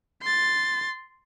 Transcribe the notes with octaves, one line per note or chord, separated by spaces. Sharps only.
C6 A6